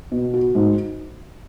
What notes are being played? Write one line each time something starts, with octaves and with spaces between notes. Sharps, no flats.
B2
F#4
G#2